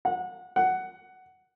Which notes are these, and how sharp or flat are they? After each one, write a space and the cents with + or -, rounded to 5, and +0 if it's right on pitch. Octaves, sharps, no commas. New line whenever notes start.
F#5 -25
F#5 +10